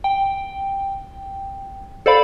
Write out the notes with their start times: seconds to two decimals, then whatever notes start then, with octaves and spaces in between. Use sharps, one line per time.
0.04 G5
2.06 A4 C5 D5 F5 B5